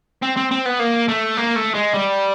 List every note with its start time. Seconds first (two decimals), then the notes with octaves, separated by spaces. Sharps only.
0.22 C4
0.37 C4
0.51 C4
0.65 B3
0.79 A#3
1.08 A3
1.37 A#3
1.56 A3
1.74 G#3
1.94 G3